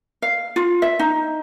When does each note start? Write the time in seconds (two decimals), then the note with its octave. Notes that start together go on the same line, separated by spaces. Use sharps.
0.22 F5
0.56 F4
0.82 E5
0.99 D#4